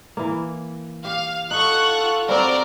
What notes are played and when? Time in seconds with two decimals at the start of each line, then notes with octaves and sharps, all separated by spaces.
0.17 E3 A#3
1.05 G4 F5
1.51 D#4 F4 A4 F#5 C#6 F#6
2.29 G3 C4 F#4 A#4 C5 D5